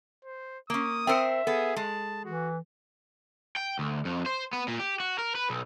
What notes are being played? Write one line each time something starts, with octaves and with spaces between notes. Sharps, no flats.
C5
A#3 C#4 D#6
C4 A#4 C5 E5 G5 E6 C#7
B3 G#4 A4
G#3 A5
E3 F#4
G5
D2
F2
C5
B3
A#2
G4
F#4
A#4
B4
B1